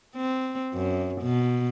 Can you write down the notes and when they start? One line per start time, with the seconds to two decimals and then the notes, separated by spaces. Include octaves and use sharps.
0.16 C4
0.74 F#2
1.22 B2